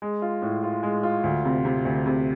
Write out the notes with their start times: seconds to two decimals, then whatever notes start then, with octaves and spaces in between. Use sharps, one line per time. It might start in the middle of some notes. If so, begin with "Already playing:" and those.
0.02 G#3
0.22 F4
0.42 A2
0.63 F4
0.83 G#3
1.03 F4
1.24 D2
1.45 C3
1.65 C3
1.85 D2
2.06 C3